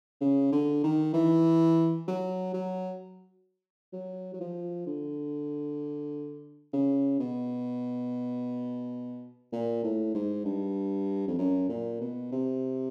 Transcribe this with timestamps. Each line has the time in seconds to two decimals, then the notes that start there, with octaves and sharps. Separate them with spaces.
0.21 C#3
0.52 D3
0.84 D#3
1.14 E3
2.08 F#3
2.54 F#3
3.93 F#3
4.33 F#3
4.40 F3
4.86 D3
6.73 C#3
7.20 B2
9.53 A#2
9.84 A2
10.14 G#2
10.45 G2
11.28 F2
11.38 F#2
11.69 A#2
12.01 B2
12.32 C3